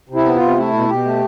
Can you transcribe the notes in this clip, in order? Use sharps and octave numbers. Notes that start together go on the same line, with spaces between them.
C3
E4
B3
F4
C3
A3 E4
B2
B2 G4
A3